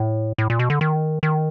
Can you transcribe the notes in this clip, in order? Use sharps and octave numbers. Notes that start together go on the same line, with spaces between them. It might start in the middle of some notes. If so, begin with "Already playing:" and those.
Already playing: A2
A2
A#2
B2
D3
D#3
D#3